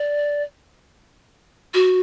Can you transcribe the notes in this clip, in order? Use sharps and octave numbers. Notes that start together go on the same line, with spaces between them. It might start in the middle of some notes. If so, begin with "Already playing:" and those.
Already playing: D5
F#4